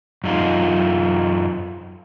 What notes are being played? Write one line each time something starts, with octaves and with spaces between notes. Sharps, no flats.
F#2 D#4 F4